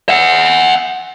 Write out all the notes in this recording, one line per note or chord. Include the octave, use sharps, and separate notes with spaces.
E5 F#5